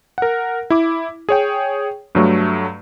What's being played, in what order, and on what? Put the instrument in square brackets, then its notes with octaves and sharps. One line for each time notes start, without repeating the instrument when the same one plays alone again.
[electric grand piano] A#4 F#5
E4 D6
G#4 C#5 G5
G2 F#3 A3